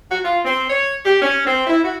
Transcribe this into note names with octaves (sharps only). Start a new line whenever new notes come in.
F#4
F4
C4
C#5
G4
C#4
C4
E4
F#4